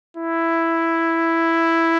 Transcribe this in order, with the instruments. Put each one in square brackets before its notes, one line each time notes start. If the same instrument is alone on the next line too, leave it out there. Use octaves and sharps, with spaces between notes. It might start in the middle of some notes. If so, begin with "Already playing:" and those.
[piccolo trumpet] E4